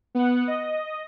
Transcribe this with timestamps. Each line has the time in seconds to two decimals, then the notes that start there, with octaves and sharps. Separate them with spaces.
0.15 B3 F#5
0.48 D#5